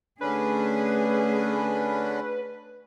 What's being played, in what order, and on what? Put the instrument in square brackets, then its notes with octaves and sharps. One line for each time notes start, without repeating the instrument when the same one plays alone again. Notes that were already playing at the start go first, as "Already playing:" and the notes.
[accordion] D3 C#4 D4 [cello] A3 G#4 [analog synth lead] B4